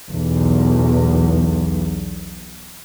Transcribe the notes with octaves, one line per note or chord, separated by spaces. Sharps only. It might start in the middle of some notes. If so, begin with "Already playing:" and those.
B1 E2